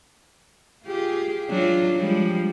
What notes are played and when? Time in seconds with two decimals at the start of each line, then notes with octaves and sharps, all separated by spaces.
0.85 F4 G4 G#4
1.49 F#3 D4 F4
1.99 F3 G3 G#3